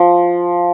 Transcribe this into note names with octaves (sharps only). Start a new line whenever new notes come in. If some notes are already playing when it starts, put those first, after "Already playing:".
Already playing: F3